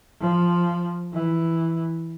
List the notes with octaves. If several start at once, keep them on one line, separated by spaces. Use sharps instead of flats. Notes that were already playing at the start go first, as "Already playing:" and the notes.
F3
E3